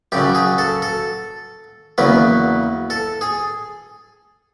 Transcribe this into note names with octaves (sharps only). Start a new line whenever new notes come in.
F#2 C#3 F#3 G4
G#4
A4
A4
E2 C#3 F#3 A#3 B4
A4
G#4